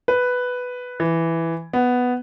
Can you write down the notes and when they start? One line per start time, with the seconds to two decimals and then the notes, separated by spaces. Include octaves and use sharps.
0.08 B4
1.00 E3
1.73 B3